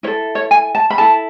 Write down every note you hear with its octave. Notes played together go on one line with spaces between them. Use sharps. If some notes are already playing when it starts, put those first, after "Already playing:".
E4 A4 C#5
C#5
G#5
A5
B5
E4 A4 A5